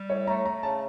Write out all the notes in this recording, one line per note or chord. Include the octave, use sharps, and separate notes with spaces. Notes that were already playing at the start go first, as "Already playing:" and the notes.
Already playing: G3
A2 C#5
A3 A#5
A3 A#5
C#3 A5